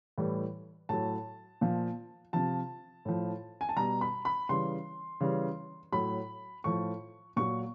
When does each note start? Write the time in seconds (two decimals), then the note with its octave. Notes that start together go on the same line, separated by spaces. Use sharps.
0.18 A2 E3 G3
0.89 A2 F#3 A5
1.61 A#2 F3
2.33 C3 F3 A5
3.05 A2 F3
3.61 G#5
3.69 A5
3.76 B2 G3 A#5
4.01 B5
4.25 B5
4.49 C#3 E3 G3 C6
5.21 C#3 E3 G3
5.93 A2 F#3 B5
6.64 A2 F3 C#6
7.36 A#2 F#3 C#6